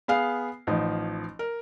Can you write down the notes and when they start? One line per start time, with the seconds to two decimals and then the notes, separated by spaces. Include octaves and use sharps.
0.08 B3 G#4 F5 C7
0.67 A1 F3 D#4
1.39 A#4